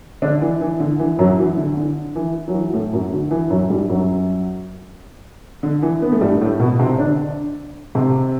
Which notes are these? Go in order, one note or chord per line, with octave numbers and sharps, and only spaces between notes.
D3 D4
E3
E3
D3
E3
F#2 F#3
E3
D3
D3
E3
F#3
E3
A2 A3
F#2 F#3
D3
E3
F#2 F#3
G2 G3
F#2 F#3
D3
E3
B3
A3
G2 G3
A2 A3
B2 B3
C3 C4
D3 D4
C3 C4